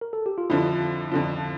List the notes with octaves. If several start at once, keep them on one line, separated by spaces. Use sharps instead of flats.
A#4
A4
G4
F4
F2 D3 F3 E4
F2 D3 F3